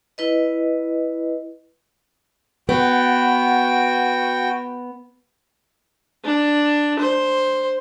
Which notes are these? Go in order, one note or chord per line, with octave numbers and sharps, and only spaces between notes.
E4 B4 D#5
B3 F#4 G5
D4
C5